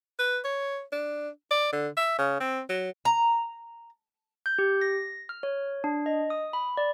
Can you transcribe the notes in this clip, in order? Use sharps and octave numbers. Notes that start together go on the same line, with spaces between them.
B4
C#5
D4
D5
D3
E5
C#3
C4
F#3
A#5
G6
G4
A#6
F6
C#5
D4
D#5
D#6
B5
D5